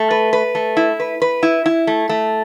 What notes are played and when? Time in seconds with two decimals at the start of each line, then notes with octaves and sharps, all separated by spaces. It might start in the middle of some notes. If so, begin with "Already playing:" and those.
Already playing: A3
0.11 B4
0.33 B4
0.55 A3
0.77 E4
1.00 B4
1.22 B4
1.43 E4
1.66 E4
1.87 A3
2.09 A3